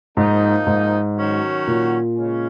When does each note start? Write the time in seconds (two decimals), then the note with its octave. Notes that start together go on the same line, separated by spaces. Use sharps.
0.17 G#2 F3 A#3 D#4
0.67 G#2
1.17 D#3 F#3 C#4 F#4
1.67 A#2
2.17 C#3 G#3 C#4